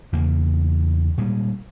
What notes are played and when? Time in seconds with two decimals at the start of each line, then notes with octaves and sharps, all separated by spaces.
0.13 E2 C#3 A#3
1.18 A#2 G3 G#3